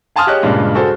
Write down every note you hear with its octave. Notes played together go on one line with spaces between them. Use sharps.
F5 G#5 A5 C6 D#6 F6
G4 G#4 C#5 D#5 F#6
G2 A#2 C#3 G#3
F#4 G#4 A4 C5